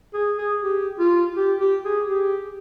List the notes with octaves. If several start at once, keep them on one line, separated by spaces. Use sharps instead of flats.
G#4
G#4
G4
F4
G4
G4
G#4
G4